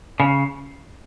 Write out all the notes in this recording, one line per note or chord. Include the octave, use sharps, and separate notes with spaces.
C#3